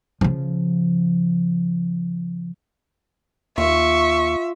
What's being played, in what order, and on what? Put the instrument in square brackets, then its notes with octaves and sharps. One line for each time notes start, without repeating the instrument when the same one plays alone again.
[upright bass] C#3 F3
[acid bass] D#2 [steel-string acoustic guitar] F4 [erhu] E5 [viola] C#6